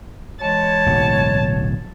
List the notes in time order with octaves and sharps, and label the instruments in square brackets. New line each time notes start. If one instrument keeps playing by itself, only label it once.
[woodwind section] E3 G#3 C#5 [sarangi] A5
[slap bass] D1 B1 F#3